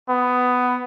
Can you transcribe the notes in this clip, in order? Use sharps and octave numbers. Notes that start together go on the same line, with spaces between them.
B3